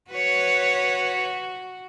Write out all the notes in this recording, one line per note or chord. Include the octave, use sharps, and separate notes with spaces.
F#4 B4 C#5